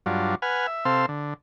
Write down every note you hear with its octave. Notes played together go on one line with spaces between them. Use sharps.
G2 F#3 D4 F4
B4 F#5 G#5 F6
E5
C3 C4 A4 F5 C6 E6
D3